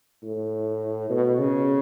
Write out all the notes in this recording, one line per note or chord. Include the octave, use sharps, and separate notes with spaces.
A2
B2
C#3